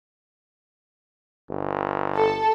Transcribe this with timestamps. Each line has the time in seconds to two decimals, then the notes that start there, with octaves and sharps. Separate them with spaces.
1.49 G1
2.15 A4